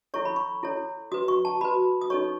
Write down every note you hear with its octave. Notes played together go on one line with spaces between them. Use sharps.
E4 A4 C#5 C#6
B5
C#6
E4 A4 C#5
F#4 B4 D#6
C#6
A5
F#4 B4 B5
D#6
D#4 A4 C#5 C#6